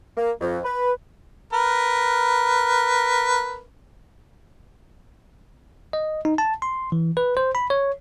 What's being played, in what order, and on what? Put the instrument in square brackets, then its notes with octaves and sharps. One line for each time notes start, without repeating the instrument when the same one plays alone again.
[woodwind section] A#3
F2
B4
[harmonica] A#4 B4
[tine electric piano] D#5
D#4
A5
C6
E3
B4
C5
B5
C#5